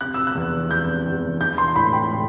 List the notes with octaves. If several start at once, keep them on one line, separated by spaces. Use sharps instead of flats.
C3 F#6
E6
F#6
E2
E2 G6
E2
E3 G6
C6
A2 B5
G5
A2